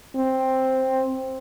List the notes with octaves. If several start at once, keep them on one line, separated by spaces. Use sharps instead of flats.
C4